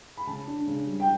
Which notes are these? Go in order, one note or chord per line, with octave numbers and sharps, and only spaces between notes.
B5
C#3 A5
D4
C#3
G3
G5